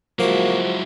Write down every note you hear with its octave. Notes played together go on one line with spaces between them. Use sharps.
F3 F#3 G#3 A#3 E4 F#4